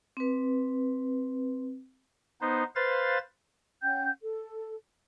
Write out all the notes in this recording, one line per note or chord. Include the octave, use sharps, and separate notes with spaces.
C4 B4
B3 D#4 C5
B4 C5 F5 A6
C#4 F#5 G5 G6
A4